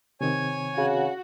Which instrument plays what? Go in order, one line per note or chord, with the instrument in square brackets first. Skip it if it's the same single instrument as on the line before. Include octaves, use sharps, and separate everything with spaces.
[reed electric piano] C3 D#3 C4 [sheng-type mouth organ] C#5 G#5
[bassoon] C#3 [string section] F#4